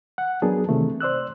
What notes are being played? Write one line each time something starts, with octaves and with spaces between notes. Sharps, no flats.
F#5
F#3 B3 D4 G#4 A#4 A5
C3 D#3 E3 A3
C5 D5 E6 F#6